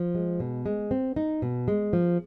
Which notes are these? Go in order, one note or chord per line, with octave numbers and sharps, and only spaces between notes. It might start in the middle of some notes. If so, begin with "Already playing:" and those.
Already playing: F3
G#3
B2
G#3
C4
D#4
B2
G#3
F3